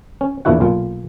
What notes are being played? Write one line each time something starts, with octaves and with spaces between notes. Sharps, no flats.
C#4
E2 A#2 D4 E4 F#4 F#5
B1 A#2 F4